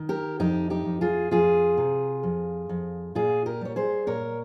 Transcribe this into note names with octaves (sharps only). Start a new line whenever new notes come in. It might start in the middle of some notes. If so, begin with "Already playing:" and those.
Already playing: D#3
G4 A#4
F2 D#4 G4
D#4 G4
F2
F4 G#4
F2 F4 G#4
C3
F2
F2
A#2 F4 G#4
G4 A#4
G3 C#5
G#4 C5
A#2 A#4 C#5